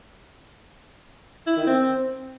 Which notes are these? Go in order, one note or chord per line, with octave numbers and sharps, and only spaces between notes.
E4
D#3
C4